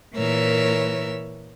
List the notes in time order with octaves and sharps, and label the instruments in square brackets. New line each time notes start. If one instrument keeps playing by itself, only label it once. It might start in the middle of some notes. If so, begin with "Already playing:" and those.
[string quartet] A#2 E3 A#4 C#5 E6